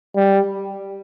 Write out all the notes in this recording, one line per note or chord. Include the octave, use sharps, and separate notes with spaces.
G3